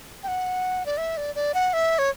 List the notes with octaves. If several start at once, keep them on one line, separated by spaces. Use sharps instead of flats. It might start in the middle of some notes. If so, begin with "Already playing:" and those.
G5
F#5
D5
E5
D5
D5
F#5
E5
C#5